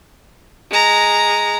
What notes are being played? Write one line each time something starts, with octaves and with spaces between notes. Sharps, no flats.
G#3 A#5